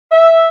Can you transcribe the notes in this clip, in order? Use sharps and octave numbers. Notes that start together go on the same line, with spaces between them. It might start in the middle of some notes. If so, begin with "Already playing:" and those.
E5